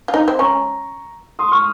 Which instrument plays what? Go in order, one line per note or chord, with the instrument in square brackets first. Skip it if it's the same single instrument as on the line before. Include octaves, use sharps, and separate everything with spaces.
[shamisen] F4
D#4
C4
[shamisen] C#4 [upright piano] A#5 C#6
[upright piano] C6 D#6
C#6 F6